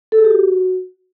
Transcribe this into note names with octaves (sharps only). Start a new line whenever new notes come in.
A4
G#4
G4
F#4